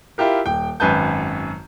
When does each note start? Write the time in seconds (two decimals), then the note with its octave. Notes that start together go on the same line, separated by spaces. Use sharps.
0.18 E4 F4 G4 A#4
0.46 D#1 G5
0.80 G#1 F#2 B4 G#5 A5 G6